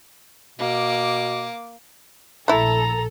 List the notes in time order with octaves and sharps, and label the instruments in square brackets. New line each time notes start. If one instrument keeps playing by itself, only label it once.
[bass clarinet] B2 [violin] A#3 D6
[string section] A#1 A4 [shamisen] A3 E4 [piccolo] A#5